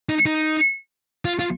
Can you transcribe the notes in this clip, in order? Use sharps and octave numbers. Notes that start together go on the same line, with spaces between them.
D#4
D#4
F4
F4